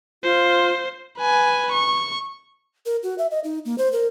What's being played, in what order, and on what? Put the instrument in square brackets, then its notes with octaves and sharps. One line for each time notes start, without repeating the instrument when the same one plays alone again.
[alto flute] F4 [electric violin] C5
[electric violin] B4 G#5
C#6
[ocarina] A#4
F#4
E5
D#5
D#4
A#3
C5
A#4